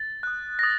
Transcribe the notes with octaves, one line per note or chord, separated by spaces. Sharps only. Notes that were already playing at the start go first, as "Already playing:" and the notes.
Already playing: A6
D#6 F#6
A#6
D#6 A6